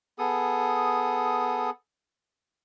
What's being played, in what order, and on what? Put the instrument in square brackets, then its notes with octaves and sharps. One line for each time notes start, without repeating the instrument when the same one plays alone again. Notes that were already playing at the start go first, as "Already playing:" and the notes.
[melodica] B3 G#4 A4 D#6